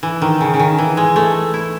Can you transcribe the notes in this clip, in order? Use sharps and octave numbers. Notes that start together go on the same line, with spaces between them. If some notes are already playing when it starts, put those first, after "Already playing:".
E3
D#3
C#3
C#3
D#3
E3
G#3
A3
E4